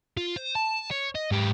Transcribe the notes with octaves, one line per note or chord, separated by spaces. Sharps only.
F4
C5
A5
C#5
D#5
G#2 G4